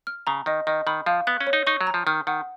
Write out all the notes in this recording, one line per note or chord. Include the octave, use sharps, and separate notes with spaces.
F6
C#3 A#5
D#3 D#5
D#3 D#5
D#3 B5
F3 F5
B3 F#6
C#4
C#5
D#4
D#4 C#6
F#3
A#5
F3
D#3 F6
D#3 F#5